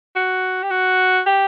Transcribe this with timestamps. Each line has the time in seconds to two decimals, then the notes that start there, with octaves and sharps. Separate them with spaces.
0.16 F#4
0.63 G4
0.71 F#4
1.26 G4